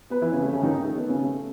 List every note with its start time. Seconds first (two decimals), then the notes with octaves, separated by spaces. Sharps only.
0.10 B3 B4
0.21 E3 E4
0.32 C#3 C#4
0.43 A3
0.53 C#3 C#4
0.63 D#3 D#4
0.85 A3
0.95 B3
1.09 C#3 C#4
1.23 A3